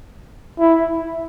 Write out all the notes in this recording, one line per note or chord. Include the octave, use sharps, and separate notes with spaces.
E4